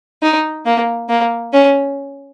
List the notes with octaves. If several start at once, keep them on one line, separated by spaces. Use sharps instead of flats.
D#4
A#3
A#3
C#4